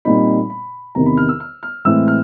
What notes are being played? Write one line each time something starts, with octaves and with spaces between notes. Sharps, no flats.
A#2 G3 C4 D#4 B5
B5
E2 C3 D#3 A#5
B5
F6
E6
F6
F6
A2 E3 G#3 C4 E4 E6
F6